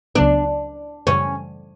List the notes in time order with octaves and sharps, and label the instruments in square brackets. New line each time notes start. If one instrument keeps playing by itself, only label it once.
[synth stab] C#2 C#3 F#3 B3 [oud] D4
[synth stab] F#2 C#3 E3 G3 [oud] C#4